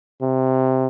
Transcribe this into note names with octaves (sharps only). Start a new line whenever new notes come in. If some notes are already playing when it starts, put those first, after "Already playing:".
C3